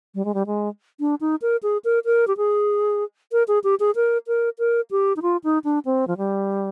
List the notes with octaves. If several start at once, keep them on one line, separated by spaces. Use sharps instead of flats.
G3
G#3
G3
G#3
D4
D#4
A#4
G#4
A#4
A#4
G4
G#4
A#4
G#4
G4
G#4
A#4
A#4
A#4
G4
D#4
F4
D#4
D4
C4
F3
G3